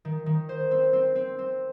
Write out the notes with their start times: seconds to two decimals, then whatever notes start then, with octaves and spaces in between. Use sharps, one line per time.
0.05 D#3
0.26 D#3
0.49 C5
0.71 C4
0.93 C4
1.15 C4
1.38 C4